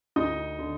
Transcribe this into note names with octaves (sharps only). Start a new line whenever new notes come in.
D2 D#4 D#5
D3